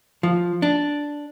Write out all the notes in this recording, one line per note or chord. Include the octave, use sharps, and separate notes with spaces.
F3
D4